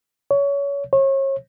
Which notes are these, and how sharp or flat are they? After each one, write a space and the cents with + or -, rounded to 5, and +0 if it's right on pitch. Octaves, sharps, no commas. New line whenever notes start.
C#5 +25
C#5 -35